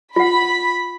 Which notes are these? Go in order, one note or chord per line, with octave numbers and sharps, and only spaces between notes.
F4 F#5 B5